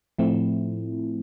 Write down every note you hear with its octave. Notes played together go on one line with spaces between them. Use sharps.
A2 F3 A3 C4 E4